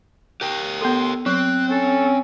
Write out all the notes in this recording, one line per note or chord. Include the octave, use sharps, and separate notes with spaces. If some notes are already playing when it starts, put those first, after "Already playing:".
G4 A#4 G5
B3 A4 C6
F#3 C4 F#6
C#4 A4